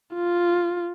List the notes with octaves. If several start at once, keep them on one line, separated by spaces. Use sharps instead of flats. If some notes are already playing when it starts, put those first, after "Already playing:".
F4